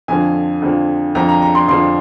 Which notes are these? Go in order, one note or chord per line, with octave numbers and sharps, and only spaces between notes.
F2 D3 F3 G#5
F2 D3 F3
F2 D3 F3 A#5
A#5
A#5
C6
F2 D3 F3 C6